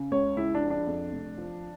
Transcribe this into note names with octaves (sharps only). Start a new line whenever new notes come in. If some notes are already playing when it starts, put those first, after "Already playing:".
Already playing: C#3
C#2 C#5
C#2 E4
D4
F3
D4
F2
F1
F3